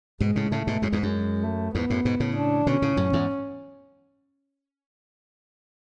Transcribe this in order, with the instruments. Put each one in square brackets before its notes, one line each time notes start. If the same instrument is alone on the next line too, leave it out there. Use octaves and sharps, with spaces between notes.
[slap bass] G#2 B2 [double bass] G#3
[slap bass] A2 C#3
[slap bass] A2 C#3 [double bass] A3
[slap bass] G#2 B2
[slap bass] F#2 A2 [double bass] G#3
[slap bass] E2 G#2
F#2
[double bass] A3
[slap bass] E2 G#2 [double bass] B3
[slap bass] F#2 A2
G#2 B2
A2 C#3
[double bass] D4
[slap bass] B2 D3 [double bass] C#4
[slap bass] A2 C#3
F#2 A2
E2 G#2